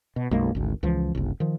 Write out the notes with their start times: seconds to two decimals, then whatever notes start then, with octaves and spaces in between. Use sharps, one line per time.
0.16 B2
0.31 B1 F#2 G#3 A#3
0.55 G#1 D2
0.83 C#2 E3 F3
1.15 F#1 C2
1.40 D#3 F3